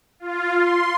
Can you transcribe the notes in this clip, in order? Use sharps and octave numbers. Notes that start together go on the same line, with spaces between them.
F4
C6